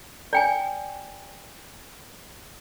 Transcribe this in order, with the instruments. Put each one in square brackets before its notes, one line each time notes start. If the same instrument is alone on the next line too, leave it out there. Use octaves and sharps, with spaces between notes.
[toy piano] D5 G5 G#5